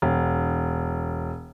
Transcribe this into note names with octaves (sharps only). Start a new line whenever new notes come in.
E1